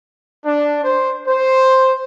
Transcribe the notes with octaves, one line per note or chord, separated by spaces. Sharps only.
D4
C5
C5